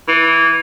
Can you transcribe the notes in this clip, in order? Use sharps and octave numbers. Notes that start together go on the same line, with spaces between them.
E3